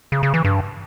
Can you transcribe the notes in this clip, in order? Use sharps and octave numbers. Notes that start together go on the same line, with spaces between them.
C#3
C#3
E3
G2